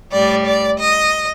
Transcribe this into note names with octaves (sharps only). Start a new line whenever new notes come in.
A2 G3 D5
D5
D#5